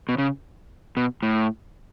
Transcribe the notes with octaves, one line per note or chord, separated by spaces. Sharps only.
B2
C#3
B2
A2